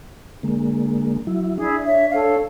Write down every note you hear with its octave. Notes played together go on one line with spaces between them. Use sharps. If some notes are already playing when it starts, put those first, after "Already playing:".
D3 G#3 A#3
F#3 E4
D4 E4 G#4
C#5 E5
A4 C#5 F5